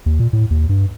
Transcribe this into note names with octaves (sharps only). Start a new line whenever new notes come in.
D#2
A#2
A2
D#2
G2